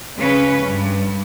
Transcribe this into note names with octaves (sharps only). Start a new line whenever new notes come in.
C#3 C#4 B4
G2